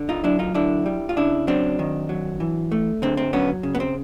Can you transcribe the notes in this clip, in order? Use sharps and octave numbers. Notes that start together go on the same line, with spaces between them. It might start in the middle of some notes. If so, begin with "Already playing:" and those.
Already playing: D3
D#4 F4
F#3 D4 E4
D#4 F4
D3 D4 E4
G3
F4
C#3 D4 E4
F#3 C4 D4
D#3
F#3
E3
A3
D3 C4
C4
F#3 B3 C#4
C#3
B3
C4